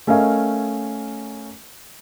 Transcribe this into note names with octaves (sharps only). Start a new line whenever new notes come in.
A3 C#4 A#4 D#5 F5 G#5